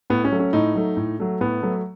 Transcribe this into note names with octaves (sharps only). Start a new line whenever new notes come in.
A2 B3
C#4
F#3 A3
C#4
A2 D#4
F#3 A3
A2
F#3 A3
A2 B3
F#3 A3